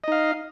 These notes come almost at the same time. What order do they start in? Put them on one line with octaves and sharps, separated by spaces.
D#5 D#4 F5